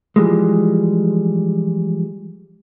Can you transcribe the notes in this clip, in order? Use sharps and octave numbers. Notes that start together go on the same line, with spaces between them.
E3 F3 G3 G#3